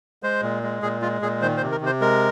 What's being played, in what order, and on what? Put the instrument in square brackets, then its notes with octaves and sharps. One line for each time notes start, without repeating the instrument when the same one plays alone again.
[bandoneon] G#3 C5
A#2
G#3
A#2 G#4
G#3 F4
A#2 G#4
D#3 C5
C5
C3
A#4
C3
C5
G#3 A#4